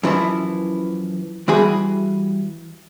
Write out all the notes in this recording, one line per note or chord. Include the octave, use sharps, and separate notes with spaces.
F#2 E3 F3 E4
E3 G3 F#4 G#4 B5